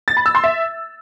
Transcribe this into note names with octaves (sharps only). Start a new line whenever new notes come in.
A6
B5
E6
C6
E5